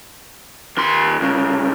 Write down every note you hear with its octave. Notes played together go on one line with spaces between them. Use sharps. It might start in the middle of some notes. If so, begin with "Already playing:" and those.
D#2 C6
C2 C#3